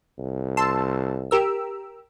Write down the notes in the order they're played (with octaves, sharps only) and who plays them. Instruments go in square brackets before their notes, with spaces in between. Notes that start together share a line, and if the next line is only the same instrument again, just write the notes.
[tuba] C2
[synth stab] A5 C6 E6
G4 A#4 E6